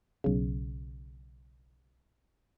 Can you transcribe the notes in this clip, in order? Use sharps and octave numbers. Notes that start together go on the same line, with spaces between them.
B1 C#3